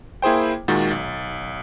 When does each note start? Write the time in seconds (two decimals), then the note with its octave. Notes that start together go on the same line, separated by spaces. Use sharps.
0.22 A#3 E4 G#4 C5 G5
0.68 A#2 D#3 G#3 F#4 A6
0.91 B1